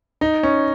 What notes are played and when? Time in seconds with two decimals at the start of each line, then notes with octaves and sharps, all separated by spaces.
0.21 D#4
0.43 C#4